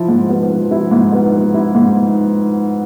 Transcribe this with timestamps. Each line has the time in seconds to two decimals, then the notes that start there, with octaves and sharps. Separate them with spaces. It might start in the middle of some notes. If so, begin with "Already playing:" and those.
Already playing: F3 E4
0.09 G#2
0.29 B3
0.50 F3
0.71 E4
0.91 G#2
1.12 B3
1.33 F3
1.54 E4
1.75 G#2